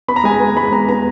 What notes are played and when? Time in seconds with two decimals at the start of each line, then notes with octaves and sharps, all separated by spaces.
0.08 B3 B5
0.16 A#5
0.24 G#3 G#5
0.34 A#5
0.40 B3
0.55 G#3 B5
0.72 B3 A#5
0.89 B3 A#5